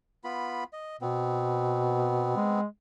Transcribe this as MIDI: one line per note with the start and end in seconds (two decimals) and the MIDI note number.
0.24 0.64 59
0.24 0.64 65
0.24 0.64 83
0.73 0.96 75
1.01 2.34 47
1.01 2.61 59
1.01 2.61 60
2.36 2.65 56